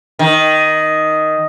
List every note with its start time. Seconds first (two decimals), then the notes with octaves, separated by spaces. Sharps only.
0.19 D#3